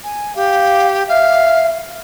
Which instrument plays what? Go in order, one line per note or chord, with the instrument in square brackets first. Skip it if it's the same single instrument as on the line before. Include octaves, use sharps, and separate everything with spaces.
[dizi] G#5
[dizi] G4 [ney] F5
[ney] E5 [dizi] F5